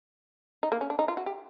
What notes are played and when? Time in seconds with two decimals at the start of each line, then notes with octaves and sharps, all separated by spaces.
0.63 D#4
0.72 A#3
0.81 C#4
0.90 D4
0.99 D#4
1.08 F4
1.17 F#4
1.26 G4